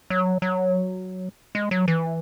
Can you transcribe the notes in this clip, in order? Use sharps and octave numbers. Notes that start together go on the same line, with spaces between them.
F#3
F#3
G#3
F#3
E3